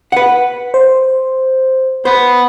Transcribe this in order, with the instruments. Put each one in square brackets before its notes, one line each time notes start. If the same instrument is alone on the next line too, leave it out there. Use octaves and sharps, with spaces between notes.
[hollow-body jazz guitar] B4 F#5
[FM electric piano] C5
[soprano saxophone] B3 [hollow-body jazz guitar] C5